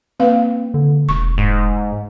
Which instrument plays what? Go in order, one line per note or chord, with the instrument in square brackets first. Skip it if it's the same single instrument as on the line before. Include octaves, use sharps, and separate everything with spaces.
[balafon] A#3 B4 F5 [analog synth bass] C4
[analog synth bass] D3
[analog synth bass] E1 [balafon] C#6
[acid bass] G#2